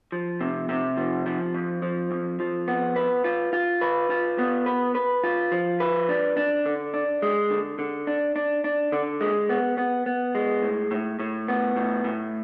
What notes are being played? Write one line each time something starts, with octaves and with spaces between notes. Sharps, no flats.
F3
C3
C3
F3
F3
F2
F3
F2
F3
B3
B4
F4
F4
B4
F4
B3
B4
B4
F4
F3
B4
D4
D4
D3
D4
G#3
D3
D3
D4
D4
D4
D3
G#3
B3
B3
B3
G#3
A2
A2
A2
B3
A2
A2